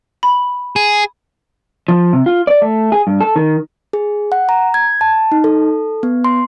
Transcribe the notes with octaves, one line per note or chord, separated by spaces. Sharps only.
B5
G#4
F3
C3
F4
D5
A3
G#4
G2
A4
D#3
G#4
F#5
A#5
G#6
A5
D#4
A4
B3
C6